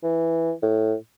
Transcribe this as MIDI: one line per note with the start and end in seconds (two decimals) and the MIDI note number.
0.03 0.52 52
0.62 0.94 45